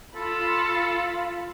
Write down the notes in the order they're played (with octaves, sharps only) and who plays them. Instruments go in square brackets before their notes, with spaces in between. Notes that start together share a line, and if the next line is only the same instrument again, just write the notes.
[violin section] F4 B5 [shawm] A4